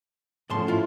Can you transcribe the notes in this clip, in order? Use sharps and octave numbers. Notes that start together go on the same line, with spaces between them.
E2 A2 F3 C#4 A5 C6
E4 F4